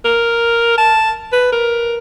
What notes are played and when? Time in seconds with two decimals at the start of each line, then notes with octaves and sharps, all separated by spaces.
0.05 A#4
0.78 A5
1.33 B4
1.52 A#4